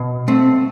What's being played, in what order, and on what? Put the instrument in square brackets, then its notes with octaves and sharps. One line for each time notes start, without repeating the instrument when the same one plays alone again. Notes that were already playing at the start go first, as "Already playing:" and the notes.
Already playing: [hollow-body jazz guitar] B2
A3 C4